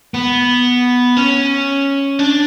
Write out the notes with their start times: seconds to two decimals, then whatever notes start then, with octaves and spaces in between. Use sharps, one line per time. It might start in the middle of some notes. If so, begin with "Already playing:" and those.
0.14 B3
1.17 C#4
2.19 D4